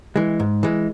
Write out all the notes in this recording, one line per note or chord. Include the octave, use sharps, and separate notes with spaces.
E3 G#3
G#2
E3 G#3